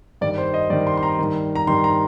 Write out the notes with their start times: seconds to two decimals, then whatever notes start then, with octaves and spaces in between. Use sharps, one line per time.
0.21 G2 D#3 D5
0.38 C5
0.54 D#5
0.70 G2 D#3 D5
0.87 C6
0.97 C6
1.03 A#5
1.19 G2 D#3
1.55 A#5
1.67 G2 D#3 C6
1.84 A#5